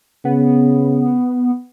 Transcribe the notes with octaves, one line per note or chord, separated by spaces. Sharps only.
C#3 B3